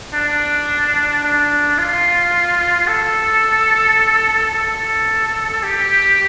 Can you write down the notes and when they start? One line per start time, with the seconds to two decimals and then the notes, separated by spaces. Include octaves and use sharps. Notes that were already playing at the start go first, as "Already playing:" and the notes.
0.14 D4
1.23 D4
1.78 F4
2.88 A4
4.54 A4
5.63 G4